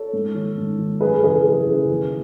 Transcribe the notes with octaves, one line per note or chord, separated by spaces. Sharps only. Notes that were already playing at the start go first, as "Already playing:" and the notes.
Already playing: A4 C#5
G#2
D#3
G#2
D#3
F#2 G#4 B4
C#3 E3 G#4 B4
F#2
C#3 E3
D#2